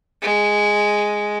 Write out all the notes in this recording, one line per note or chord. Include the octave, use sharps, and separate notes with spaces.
G#3